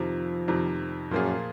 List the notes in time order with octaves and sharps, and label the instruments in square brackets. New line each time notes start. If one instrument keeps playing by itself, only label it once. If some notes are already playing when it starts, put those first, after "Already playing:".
Already playing: [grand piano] F2 C3 D#3 [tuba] F3
[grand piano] F2 C3 D#3
[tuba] F#2 [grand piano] A#2 F3 A#3 F4 G#4